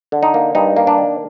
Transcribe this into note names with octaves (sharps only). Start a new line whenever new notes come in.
D3
D#4
A#3
G2 D#4
A#3
D4
D#3